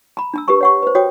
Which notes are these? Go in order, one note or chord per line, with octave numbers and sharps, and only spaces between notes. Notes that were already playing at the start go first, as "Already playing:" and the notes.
A#5 B5
D4 A#5 E6
G4 A#4 B4 A#5 C#6
C#5 F#5 C#6
B4 C5
F#4 C#5 G5 D#6